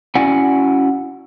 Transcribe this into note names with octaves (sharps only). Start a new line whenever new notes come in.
C#4 E4 F#4 D5 F#5 G#5